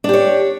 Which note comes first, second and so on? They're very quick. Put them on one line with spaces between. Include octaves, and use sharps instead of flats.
D4 G4 C#5